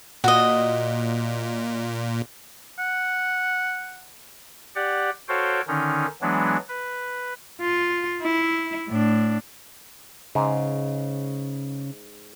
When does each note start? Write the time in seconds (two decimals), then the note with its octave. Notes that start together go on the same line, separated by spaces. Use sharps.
0.24 A#2 F#4 D#5
2.79 F#5
4.75 G4 D5 F#5
5.28 F#4 A4 C5 C#5 F5 G5
5.68 D3 D#3 C#4 D#4
6.21 E3 F#3 G#3 B3 D4
6.68 B4
7.61 F4
8.22 E4
8.88 A2 D4
10.35 G#2 C#3